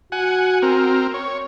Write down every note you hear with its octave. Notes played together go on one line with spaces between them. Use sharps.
F#4 F#5 G#5
C4 A#4
C#5